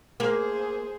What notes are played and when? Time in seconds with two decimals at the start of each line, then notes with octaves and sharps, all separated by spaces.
0.20 A#3 G#4 C5